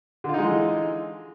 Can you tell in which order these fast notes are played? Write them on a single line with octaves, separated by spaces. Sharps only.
D3 F4 D#4 G#3 E3